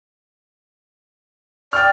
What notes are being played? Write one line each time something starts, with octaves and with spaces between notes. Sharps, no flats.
D5 G5 F6